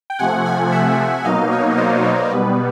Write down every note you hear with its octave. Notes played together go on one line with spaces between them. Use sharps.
G5
C3 F3 A3 F#5 G#5
F#5 G#5
E5 F#5
B2 F#3 A#3 D#4 D#5 F5
C#5 D#5
D#5
C5 D5
B4 C#5
A#4
B2 G3 B3 B4